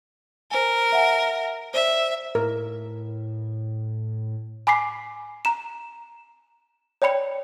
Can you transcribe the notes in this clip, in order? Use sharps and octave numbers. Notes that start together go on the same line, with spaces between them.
A#4 C5 G#5
E5 F#5 G#5
C5 D5 E5
A2 A#4
G#5 B5 D6 B6 C7
A#5 E7
C#5 D5 G5 B5 C#7